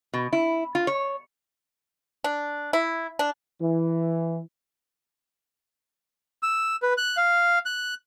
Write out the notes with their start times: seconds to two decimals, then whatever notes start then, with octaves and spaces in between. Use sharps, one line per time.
0.14 B2
0.33 E4
0.75 F4
0.87 C#5
2.24 D4
2.73 E4
3.19 D4
3.61 E3
6.43 E6
6.83 B4
6.98 F#6
7.17 F5
7.66 F#6